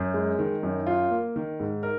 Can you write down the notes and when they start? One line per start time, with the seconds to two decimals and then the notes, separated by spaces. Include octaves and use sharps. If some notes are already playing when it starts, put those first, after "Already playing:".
Already playing: F#2
0.14 G#3
0.39 D#3
0.63 F#2
0.87 F4
1.10 A#3
1.36 D#3
1.60 G#2
1.83 A#4